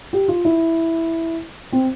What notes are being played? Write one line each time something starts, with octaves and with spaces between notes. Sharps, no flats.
G4
F4
E4
C4